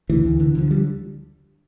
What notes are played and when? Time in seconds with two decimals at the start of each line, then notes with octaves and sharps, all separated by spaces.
0.09 D2 E3
0.25 D2
0.40 D3
0.55 D3 F3
0.71 G3